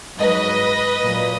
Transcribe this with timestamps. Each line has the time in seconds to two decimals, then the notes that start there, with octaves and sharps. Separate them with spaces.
0.18 G#2 F#3 B4 D#5
1.04 A#2 F#3